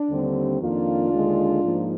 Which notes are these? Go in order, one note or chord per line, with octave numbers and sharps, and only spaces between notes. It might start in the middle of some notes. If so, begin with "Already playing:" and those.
Already playing: D4
D#2 D3 G3 C4
F2 D#3 A#3 D4 F4
D#2 D3 G#3
G#2 F3 A#3